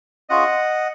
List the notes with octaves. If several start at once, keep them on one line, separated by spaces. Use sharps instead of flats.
C#4 F4 G#4 D#5 F#5